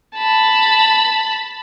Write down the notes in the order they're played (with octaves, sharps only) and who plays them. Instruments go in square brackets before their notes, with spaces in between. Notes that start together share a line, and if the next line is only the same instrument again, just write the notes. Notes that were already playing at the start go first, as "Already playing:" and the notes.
[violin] A5 B5